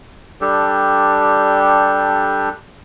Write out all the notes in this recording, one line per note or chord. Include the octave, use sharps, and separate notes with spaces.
G3 D4 G4 A4